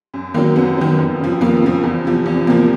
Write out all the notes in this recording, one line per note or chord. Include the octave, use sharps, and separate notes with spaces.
F#2
D#3 F#3 A#3 C4
F#2 B3
D#3 F#3
F2
C#3 F3
F2 A#3
C#3 F3
E2
C3 F3
E2
C3 F3 A#3 C4